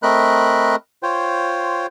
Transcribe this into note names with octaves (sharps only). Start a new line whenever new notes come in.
A3 C4 A#4 D#5 B5 F#6
F4 C5 C#5 G5